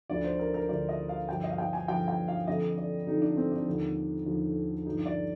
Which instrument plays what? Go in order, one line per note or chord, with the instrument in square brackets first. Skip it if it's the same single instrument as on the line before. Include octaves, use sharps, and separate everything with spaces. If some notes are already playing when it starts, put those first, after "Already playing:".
[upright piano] D2 D3 F3 D5
C5
A#4
A#4
D2 D3 F3 D5
D#5
F5
G2 D3 F3 G5
D#5
F5
G5
G#5
G2 D3 F3 G5
G5
F5
F2 D3 F3 D#5
D5
F2 D3 F3 D#4
D4
C4
D4
D#2 D3 F3
D#2 D3 F3
G2 D3 F3 D#4
D5